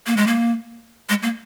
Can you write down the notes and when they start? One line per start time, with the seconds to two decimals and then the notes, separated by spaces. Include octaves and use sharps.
0.07 A#3
0.17 G#3
0.27 A#3
1.09 G#3
1.23 A#3